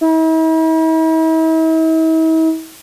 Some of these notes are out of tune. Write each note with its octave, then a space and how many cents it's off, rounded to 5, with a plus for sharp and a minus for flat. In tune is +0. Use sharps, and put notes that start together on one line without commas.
E4 -45